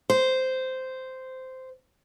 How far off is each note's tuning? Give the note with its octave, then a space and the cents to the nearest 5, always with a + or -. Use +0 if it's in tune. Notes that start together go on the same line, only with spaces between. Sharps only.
C5 -10